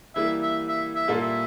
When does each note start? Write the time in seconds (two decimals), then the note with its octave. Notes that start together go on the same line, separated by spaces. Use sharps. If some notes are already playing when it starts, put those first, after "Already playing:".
0.16 E3 G3 A#3 E4 E5
0.42 E5
0.68 E5
0.96 E5
1.08 A#2 G3 A#3 F4 A4
1.21 E5